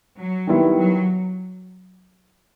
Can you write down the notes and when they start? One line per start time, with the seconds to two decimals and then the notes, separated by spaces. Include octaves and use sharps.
0.18 F#3
0.47 D#3 G3 B3 E4
0.78 F#3